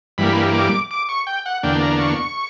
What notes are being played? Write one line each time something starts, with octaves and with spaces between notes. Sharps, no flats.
G2 E3 G3 A#3 B5
D6
D6
C#6
G5
F#5
E2 D3 A#3 D4 G5
A#5
C#6